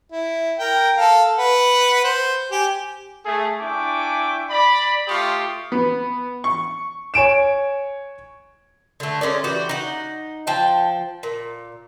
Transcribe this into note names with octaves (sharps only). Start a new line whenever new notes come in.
E4
A#4 G5
A4 F5
B4 F#5
C5
G4 G#5
A3 G#4
D4 E4 G5 G#5 C#6 D6
D5 B5
A3 F4 G4 C6 C#6 D#6
B3
C#6
C#5 G#5 D7 E7
D3 A3
G#3 C#4 A#4 D5
E3 F#4 G4 D5
D#4 F#5
F3 G5 A5
A#2